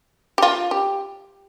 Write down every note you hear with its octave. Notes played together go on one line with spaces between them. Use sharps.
G4
F4
G4